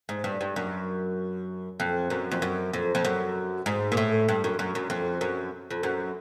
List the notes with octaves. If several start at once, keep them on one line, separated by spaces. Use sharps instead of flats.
G#2
G2
G2
F#2
F2
F#2
F2
F#2
F2
F2
F#2
G#2
A#2
A2
G2
F#2
F#2
F#2
F2
F#2
F2
F#2